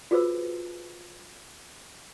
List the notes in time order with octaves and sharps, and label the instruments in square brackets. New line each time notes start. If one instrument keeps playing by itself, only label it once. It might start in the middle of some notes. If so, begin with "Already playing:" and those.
[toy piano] F4 F#4 G#4 B4 C5 E6